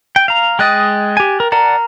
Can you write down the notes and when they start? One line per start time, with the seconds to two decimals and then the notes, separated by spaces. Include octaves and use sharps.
0.16 G5
0.28 F5 A#5
0.59 G#3 D#5 G5 D#6 F#6 A6
1.17 G4 G#5
1.40 A#4
1.52 A#4 D5 F#5 A5 A#5